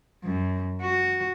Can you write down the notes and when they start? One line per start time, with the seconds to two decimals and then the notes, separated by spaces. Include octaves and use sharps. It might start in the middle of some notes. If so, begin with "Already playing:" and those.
0.24 F#2
0.82 F#4